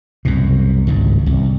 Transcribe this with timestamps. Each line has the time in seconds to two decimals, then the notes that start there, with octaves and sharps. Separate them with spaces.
0.25 C2 F#2 B2
0.87 G#1 C#2 G2
1.26 C2